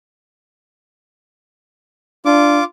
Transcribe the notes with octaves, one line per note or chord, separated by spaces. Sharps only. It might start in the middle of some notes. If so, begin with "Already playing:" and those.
D4 F4 D6